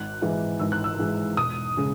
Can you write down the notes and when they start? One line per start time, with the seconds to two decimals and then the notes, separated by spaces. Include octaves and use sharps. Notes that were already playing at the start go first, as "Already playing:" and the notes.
Already playing: G#1 F#6
0.22 G#2 E3 G#3
0.59 G#1 E6
0.72 F#6
0.84 E6
0.99 G#2 E3 G#3
1.37 E1 D#6
1.77 C#3 G#3